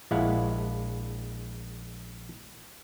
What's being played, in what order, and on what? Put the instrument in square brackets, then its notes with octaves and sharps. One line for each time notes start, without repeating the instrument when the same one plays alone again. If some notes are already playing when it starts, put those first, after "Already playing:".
[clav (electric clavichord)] A#1 G#3 E4 F5 F#5